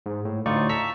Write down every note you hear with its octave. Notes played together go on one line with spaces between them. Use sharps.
G#2
A2
D2 A2 D#4 F4 D5 C#6
A5 A#5 C#6 E6 B6